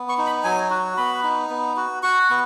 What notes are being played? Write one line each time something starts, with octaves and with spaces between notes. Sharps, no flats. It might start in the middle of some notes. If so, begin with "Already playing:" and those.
Already playing: B3
C#6
D#4
B5
F#3 G#5
F#4
B3 B5
D#4
B3
F#4
F#4 C#6
B3